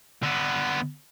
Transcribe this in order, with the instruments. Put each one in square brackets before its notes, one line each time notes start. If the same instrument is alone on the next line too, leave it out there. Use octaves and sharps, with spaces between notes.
[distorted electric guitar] D3 B3